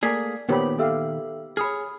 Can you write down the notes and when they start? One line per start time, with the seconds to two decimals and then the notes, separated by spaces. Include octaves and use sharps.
0.03 A3 A#3 G#4 D5 G#6 B6
0.49 A#2 D#3 B3 G4 A#4 C5 C#5 B5
0.79 G4 A4 E5 F5 E6
1.57 G#4 C#5 B5 D#6 F6